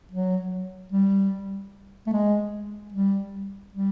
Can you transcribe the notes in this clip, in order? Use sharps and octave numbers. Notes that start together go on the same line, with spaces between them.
F#3
G3
A3
G#3
G3
G3